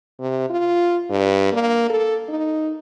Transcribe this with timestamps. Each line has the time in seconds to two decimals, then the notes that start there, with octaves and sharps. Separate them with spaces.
0.20 C3
0.50 F4
1.10 G2
1.53 A#3
1.90 A4
2.29 D#4